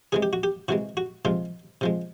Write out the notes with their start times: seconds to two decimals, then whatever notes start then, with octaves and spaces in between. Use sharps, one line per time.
0.12 C3 E3 G#3 G#4
0.23 G4
0.33 F#4
0.43 G4
0.68 C3 E3 G#3 F#4
0.97 F#4
1.25 C3 F3 G#3 F4
1.81 C3 F3 G#3